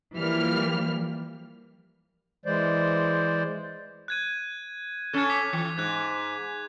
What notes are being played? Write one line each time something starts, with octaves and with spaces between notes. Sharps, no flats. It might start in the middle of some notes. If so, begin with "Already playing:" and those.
E3 F3 G3 A#3 F6
E3 G#3 C5 D5
F#6 G#6 D#7
C#4 A4 F#6 G#6
D6 B6
E3
G#2 F#6 G#6